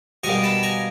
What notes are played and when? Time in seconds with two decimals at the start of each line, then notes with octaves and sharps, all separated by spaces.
0.24 B2 G3 A#3 G#5 A#5
0.43 A5 B5
0.63 G#5 A#5